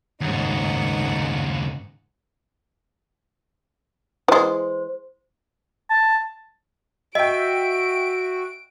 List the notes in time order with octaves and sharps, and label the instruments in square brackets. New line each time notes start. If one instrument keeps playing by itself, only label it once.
[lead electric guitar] D#2 C#3 [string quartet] G#2 D#4 F#5
[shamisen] E3 G#3 [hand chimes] C5
[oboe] A5
[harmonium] F#4 [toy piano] D#5 [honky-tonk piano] E5 G5 [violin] D7